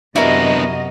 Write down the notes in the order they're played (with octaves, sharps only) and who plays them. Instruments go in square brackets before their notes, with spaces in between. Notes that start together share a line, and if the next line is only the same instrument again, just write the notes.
[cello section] F#2 C3 D#5 [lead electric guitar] B3 D4 [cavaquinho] E4 [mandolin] F#4 A#4